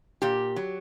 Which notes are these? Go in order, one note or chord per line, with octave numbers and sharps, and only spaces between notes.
A#2 G4
F#3